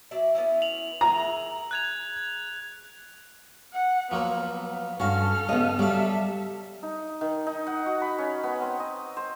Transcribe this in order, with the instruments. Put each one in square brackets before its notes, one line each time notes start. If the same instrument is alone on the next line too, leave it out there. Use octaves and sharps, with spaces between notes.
[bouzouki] F#3 E4 D5
B3 C#4 E4
[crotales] F7 F#7
[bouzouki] G#4 A#4 E5 [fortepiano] A#5
[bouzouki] G#4 [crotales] F#6 G#6 F7
[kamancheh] F#5
[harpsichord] F3 F#3 A#3 [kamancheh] B3
[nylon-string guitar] G2 F#4 [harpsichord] C#4 F5 [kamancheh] A4 F6
[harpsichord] G2 C#3 [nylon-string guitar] B3 D#5
[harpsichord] F#3 F5 [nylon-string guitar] G3 [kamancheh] A4 E5
[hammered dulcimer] D#4
D#3
D#4
F#5
F#4
B5
C#4
B3
C4
D#5
C5